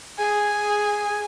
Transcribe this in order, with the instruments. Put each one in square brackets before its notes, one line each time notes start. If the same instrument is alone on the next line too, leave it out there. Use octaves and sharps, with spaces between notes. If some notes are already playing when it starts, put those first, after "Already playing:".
[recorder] G#4 [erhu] G#5